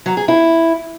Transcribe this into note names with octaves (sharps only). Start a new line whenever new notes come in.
F#3
G#4
E4